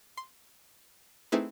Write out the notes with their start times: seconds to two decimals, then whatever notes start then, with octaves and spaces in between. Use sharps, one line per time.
0.17 C6
1.32 A3 C4 D#4 E4 G#4 B4